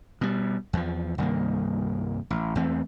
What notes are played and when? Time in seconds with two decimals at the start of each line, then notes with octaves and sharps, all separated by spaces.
0.21 B2 G3
0.73 E2 F3
1.18 C2 G2 D#3 A#3
2.30 A1
2.55 E2 E3 A3 C4